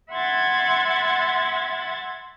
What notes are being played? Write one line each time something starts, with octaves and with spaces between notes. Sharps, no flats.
E5 F#5 B5 C6 G#6 A6